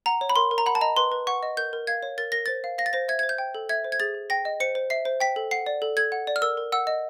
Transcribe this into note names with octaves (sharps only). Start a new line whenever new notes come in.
F#5 A#5
C#5
B5
A#4 C6
A#4
A#5
F#5 B5
A5
D#5 A#5
B4 C6
B4
F#5 C#6
D#5
A#4 G6
A#4
F5 G#6
C#5
A#4 A6
A#4 A#6
C5 A6
F5
F5 A#6
A6
C5 A#6
E5 G#6
G#6
C5
G6
G5
A4
E5 G#6
C5
G#6
G#4 A6
G#4
G5 A#6
D#5
C5 C#7
C5
E5 C7
C5
G5 B6
A4
F#5 C7
D5
A4
A4 G#6
F#5
D5
F6
A#4 E6
A#4
F#5 E6
D#5